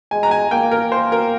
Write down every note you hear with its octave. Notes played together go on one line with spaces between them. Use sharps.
G#3 G#5
A#5
G#5
A#3 G5
A#4
C5
A#4